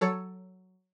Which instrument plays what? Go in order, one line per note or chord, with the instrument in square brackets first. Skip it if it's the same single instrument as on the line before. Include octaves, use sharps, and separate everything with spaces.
[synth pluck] F#3 A4 C#5